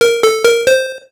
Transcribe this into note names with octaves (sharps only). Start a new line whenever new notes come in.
A#4
A4
A#4
C5